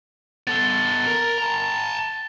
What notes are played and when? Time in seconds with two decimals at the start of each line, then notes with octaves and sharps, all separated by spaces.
0.47 B3 A4 A6 G7
1.07 A#4
1.38 A5 A#5